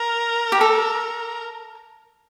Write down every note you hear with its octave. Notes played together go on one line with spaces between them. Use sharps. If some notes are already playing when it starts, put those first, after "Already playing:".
Already playing: A#4
G4
A4